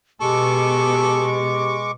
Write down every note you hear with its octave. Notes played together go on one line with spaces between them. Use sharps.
B2 G#3 G4 A4 C#6 D6